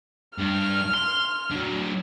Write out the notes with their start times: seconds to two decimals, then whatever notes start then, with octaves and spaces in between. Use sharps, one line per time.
0.39 G2 F6
0.94 C6
1.51 D3 F#3